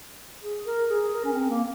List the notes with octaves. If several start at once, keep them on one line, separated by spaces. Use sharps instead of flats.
G#4
A#4
G#4
A#4
C#4
C4
A#3